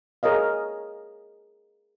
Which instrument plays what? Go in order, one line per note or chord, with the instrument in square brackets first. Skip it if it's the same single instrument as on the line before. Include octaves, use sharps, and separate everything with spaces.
[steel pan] G#4 A#4 C#5 D#5 F5